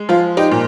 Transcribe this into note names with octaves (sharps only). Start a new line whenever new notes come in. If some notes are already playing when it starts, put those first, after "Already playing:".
Already playing: G#3
F3 F4
D#4 G4
A#2